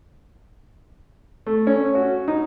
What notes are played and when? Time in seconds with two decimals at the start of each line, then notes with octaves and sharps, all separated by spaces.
1.46 A3
1.67 C#4
1.95 F#4
2.28 D#4